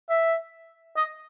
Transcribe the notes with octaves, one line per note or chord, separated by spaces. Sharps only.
E5
D#5